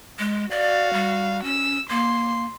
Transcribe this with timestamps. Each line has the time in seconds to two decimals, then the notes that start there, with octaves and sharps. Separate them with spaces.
0.19 G#3
0.51 F#4 D5 F5
0.93 G3
1.44 C#4 E6
1.90 A#3 C6